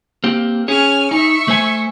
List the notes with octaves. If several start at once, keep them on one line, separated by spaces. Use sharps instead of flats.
A#3 C4 G4
C#4 G#4 C#5 G#5 F6
D#4 E5 C#6
A3 C5 G#5